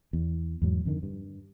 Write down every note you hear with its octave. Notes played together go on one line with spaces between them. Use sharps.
E2
E2 G#2 F3 F#3
F2 D3 D#3
G2